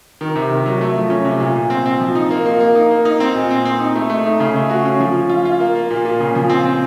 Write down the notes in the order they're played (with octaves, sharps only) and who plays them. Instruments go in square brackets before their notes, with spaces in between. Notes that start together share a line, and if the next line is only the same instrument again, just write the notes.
[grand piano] D#3
C3
D#3
F#3
A3
F3
C#4
C3
A#2
A#2
C4
C4
F3
D#4
A#3
A#3
A#3
D#4
A#3
D#4
C4
A#2
C4
C4
D#4
A3
A3
D#4
C#3
A3
F#4
C#4
F3
F3
F4
F4
A#3
A#3
A#2
A#2
C#3
F3
C4
C4